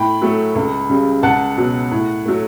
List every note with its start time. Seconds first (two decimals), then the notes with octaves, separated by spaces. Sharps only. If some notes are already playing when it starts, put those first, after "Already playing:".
Already playing: A2 G5 B5
0.22 F#3 A3
0.55 C#2
0.89 C#3 G3
1.23 C#2 F#5 A5
1.57 B2 F#3
1.91 A2
2.26 F#3 A3